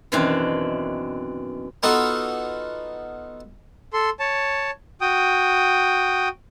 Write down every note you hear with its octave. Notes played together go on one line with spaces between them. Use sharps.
F#2 B2 D#3 E3 C4 D4
B3 D#4 F4 F#4 A4
A4 C6
C#5 A5
F#4 G5 D#6